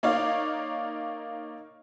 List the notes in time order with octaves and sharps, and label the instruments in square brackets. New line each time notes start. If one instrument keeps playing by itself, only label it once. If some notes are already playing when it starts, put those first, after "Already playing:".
[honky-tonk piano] A#3 D#4 C#5 D5 F5